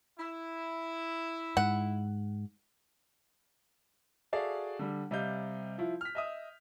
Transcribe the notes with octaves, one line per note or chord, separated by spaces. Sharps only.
E4
G#2 F#5
F#4 G#4 A4 D5 E5 F5
D3 G3
C3 G3 D#5 F5 G6
F3 E4 F4
F6 B6
D#5 E5 D#6